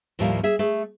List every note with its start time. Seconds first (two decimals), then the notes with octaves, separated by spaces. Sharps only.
0.19 D#2 A2 F3 G3 A#3 D5
0.43 G#4 E5
0.59 A3 G#4